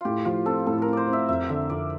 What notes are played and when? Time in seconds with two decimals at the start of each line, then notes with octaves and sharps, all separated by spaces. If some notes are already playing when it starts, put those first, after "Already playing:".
0.01 A2 F4 G4
0.25 F3 F4
0.46 C4 A4
0.67 A2 A4
0.82 A#4
0.87 C4
0.93 C5 D5
1.08 C4
1.13 E5
1.29 F2 E5
1.49 D3 E5
1.70 F2 D5